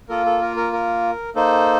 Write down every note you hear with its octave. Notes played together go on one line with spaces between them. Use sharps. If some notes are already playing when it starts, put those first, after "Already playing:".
A#3 F4 A4 A#4
A4
A#4
A#4
A#4
A#3 D#4 A4 C5